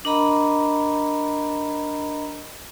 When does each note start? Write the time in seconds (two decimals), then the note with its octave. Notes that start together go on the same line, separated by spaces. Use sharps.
0.05 D4 A#4 D#5 A#5 B5